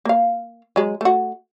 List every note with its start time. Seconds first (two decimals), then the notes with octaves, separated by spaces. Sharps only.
0.05 A#3 F5
0.76 F#3 G#3
1.01 A3 F#4